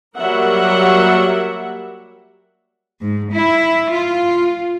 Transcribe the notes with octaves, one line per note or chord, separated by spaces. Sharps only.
F#3 G3 A#3 A#4 E5 F#5
G#2
E4
F4